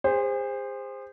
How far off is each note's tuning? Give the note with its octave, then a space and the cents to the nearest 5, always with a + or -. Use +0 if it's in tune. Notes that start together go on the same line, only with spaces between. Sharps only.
G#4 -40 C5 +0